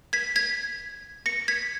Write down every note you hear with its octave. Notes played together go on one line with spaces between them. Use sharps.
G#6 B6
G#6 B6
A#6 C#7
G#6 B6